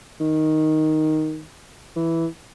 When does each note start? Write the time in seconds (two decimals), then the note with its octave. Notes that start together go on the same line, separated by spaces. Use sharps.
0.20 D#3
1.96 E3